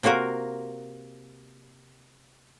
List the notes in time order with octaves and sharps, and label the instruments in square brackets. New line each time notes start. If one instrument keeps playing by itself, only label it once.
[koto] C3 A#3 F4 F#4 A#4